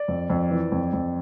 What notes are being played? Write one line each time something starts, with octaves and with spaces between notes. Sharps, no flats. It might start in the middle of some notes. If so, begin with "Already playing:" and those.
Already playing: D5
F2
F2
E3
F2
F2